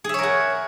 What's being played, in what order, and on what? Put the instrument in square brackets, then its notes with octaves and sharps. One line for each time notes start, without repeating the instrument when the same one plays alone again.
[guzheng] G#4
E5
C#5
A#4
F#5